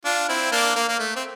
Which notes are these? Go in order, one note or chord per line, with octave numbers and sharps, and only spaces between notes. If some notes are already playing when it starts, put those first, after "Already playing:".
D4 F4
C4 E4
A#3 D4
A#3
A#3
A3
C4